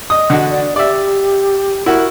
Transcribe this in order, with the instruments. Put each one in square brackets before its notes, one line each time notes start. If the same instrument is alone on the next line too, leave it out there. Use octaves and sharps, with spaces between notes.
[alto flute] D#5 [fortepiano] D#6
[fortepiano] D3 F#4
[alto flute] D5
[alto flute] G4 [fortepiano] D5 E5
[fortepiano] E4 F#4 [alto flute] A#4